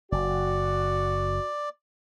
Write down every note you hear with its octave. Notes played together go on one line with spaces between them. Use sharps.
F#1 F#4 D5